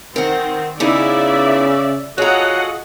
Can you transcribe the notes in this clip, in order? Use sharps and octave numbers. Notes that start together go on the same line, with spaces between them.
D#3 C4 A#4 F#5
C#3 B3 D#4 E4 D5 E5
F4 F#4 G#4 A4 C#5 D#5 F#5 A#5